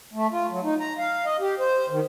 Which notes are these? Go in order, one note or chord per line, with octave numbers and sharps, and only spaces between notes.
A3
F4
F#3
D#4
A#5
F5
D#5
G4
C5
D#3